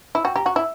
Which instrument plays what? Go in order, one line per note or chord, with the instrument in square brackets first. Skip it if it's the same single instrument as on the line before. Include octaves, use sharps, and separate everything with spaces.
[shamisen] E4 [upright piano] B5
[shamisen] F#4 [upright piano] G5
[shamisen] G4 [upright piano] A#5
[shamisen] F#4 [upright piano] F#5
[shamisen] E4 [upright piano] E5